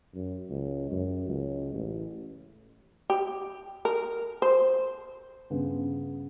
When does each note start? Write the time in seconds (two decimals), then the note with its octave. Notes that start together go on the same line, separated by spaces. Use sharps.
0.15 F#2
0.50 C#2
0.91 F#2
1.28 C#2
1.74 A1
3.10 G4
3.85 A#4
4.42 C5
5.50 G2 C#3 B3